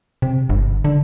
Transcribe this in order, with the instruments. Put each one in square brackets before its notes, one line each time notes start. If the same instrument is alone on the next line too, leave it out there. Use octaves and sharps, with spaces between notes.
[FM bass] C3
G1
D3